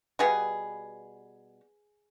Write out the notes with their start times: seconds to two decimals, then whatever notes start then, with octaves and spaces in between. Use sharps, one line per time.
0.19 B2 G3 B3 G#4